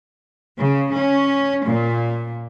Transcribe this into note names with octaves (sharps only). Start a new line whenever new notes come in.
C#3
C#4
A#2